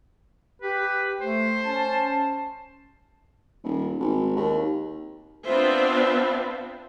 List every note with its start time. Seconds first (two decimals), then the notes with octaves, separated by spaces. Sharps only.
0.62 G4 B4
1.21 A3 C5
1.63 C#4 A5
3.64 D#1
4.00 G#1
4.37 D#2
5.44 B3 C4 D4 F4 C5 E5